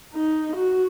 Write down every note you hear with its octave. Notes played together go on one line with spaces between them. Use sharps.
D#4
F#4